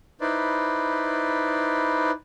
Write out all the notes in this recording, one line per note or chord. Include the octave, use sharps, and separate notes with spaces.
D#4 E4 B4 C5 D5